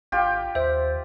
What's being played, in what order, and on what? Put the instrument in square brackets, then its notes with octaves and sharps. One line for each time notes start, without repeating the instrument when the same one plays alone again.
[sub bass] G#1 [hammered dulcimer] F4 G4
[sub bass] D#2 [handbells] C5 E5